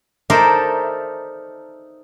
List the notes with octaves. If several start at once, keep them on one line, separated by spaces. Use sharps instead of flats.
D#4 A4 A#4 C5 D5 E5